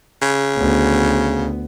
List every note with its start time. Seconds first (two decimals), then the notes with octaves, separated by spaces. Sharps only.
0.22 C#3
0.58 D2 B3